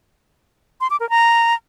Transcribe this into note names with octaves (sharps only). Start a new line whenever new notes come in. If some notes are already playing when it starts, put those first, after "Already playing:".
C6
D6
A#4
A#5